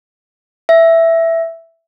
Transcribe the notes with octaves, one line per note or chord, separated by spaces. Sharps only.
E5